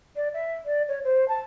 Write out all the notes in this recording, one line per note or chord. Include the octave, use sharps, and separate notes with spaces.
D5
E5
D5
C#5
C5
A5